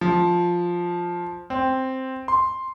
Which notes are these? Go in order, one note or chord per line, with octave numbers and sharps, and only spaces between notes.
F3
C4
C6